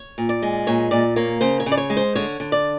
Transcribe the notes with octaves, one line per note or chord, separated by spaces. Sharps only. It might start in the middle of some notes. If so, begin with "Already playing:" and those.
Already playing: C#5
A#2
D5
G#3
A#2 C#5
A#2 D5
A#3 C#5
C#3 C5
C#5
C#3
D5
C#5
G#3
C5
D3 C#5
D3
D5